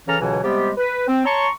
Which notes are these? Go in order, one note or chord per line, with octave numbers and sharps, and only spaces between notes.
C#3 E3 C#4 A4 A#5 F6
C#2 B2 D3 E3 F#3
C3 G3 G#3 B3 G4
B4
C4
C#5 A5 A#5 C6 C#6